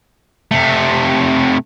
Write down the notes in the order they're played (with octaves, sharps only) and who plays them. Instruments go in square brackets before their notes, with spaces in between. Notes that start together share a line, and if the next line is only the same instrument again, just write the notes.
[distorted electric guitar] C3 A3